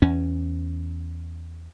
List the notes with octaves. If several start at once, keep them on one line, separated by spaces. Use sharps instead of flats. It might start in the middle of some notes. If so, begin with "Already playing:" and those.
E2 C#4